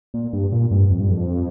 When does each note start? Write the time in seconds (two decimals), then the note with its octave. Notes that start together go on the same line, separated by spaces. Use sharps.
0.14 A#2
0.33 G2
0.52 A#2
0.71 G2
0.90 F2
1.00 G2
1.11 F2